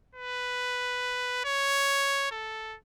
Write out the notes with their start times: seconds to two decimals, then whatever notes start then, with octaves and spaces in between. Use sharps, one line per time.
0.15 B4
1.44 C#5
2.31 A4